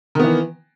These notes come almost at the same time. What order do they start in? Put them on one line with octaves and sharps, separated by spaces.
D#3 B3 E3